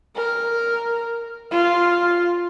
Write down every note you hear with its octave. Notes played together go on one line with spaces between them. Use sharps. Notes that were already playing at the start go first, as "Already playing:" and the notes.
A#4
F4